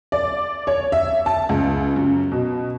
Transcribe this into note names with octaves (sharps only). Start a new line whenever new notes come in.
D5
C#5
E5
A5
C#2
F#2
B2